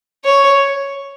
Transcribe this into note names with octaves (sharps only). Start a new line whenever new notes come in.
C#5